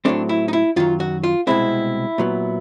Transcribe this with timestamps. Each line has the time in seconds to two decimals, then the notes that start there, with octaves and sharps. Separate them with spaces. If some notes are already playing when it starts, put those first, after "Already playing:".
0.05 A2 F#3 A3 C4 D4
0.29 E4
0.48 D#4
0.53 E4
0.76 F#2 D#3 F#3 F4
1.00 F#4
1.24 F4
1.47 C2 B2 G#3 C4 E4
2.18 A#2 F#3 B3